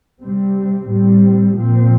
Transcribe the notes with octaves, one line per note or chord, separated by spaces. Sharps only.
C3 G3 C4
A2 G3 C4
A#2 F3 C4